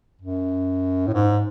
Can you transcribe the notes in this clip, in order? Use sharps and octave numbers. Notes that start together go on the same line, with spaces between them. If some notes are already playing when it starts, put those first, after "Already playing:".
F#2
A2
G#2